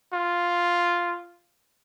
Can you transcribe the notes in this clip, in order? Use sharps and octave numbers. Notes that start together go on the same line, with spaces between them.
F4